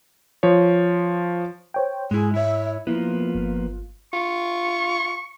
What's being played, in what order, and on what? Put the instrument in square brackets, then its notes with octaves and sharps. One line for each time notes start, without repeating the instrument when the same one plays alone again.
[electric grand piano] F3 C#5
[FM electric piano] C5 C#5 G5
[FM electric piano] G#2 [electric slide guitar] G#3 E4 [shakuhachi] G#4
[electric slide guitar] E4 C#5 [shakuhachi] E5
[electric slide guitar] F3 A#3 B3 [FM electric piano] E4 [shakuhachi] F4
[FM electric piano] G1
[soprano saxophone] F4 [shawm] C#6